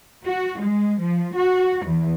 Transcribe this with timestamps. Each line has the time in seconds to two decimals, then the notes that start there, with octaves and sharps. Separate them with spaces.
0.25 F#4
0.58 G#3
1.00 F3
1.35 F#4
1.86 E2